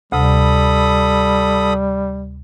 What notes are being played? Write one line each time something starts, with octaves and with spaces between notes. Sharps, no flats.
D2 C3 G3 A4 B5 D#6